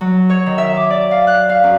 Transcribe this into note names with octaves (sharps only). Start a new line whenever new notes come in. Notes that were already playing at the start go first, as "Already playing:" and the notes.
F#3
C#5
D#3
E5
D6
D5
F5
F#6
F5
F#2